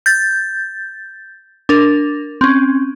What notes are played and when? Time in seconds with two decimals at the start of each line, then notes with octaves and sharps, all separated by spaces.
0.06 G6 A6
1.69 D4 A#4
2.41 C4 C#4